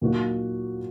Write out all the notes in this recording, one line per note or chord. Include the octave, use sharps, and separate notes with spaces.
A#2 F#3 A#3 D#4 F#4